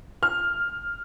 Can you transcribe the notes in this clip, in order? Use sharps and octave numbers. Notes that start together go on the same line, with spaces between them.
F6